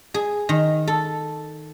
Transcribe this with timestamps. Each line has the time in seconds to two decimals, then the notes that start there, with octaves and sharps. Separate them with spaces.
0.14 G#4
0.49 D#3
0.88 A4